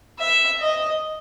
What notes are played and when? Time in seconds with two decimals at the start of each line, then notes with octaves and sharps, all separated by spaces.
0.19 E5
0.60 D#5